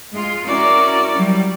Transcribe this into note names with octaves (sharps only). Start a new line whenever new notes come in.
G#3 F4
C#4 E4 F#4 A#4 D5
F#3 G3